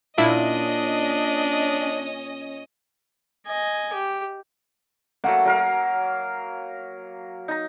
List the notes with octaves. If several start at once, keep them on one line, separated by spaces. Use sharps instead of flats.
A#2 C#4 D4 E4 D#5
D#5 G#5
G4
F#3 A3 A#3 F#5
F#3 A#4 F5
D#4 A#5